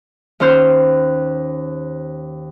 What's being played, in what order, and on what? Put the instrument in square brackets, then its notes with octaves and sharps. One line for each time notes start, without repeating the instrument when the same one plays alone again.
[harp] D#2 C#4 C5 F6 G6